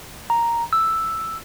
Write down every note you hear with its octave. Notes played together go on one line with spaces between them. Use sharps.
A#5
E6